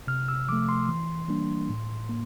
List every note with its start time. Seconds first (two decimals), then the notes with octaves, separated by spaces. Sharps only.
0.07 C3 F6
0.28 E6
0.49 F3 A3 D6
0.69 C6
0.89 E3
1.28 G3 A#3 D4
1.70 A2
2.09 A#3